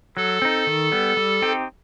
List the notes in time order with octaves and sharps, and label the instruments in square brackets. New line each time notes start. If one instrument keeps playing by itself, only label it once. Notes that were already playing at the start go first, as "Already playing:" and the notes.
[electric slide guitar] F#3 [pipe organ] A4
[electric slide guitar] C4 D#4
D#3
G3 B3
G3
C4 D#4 G4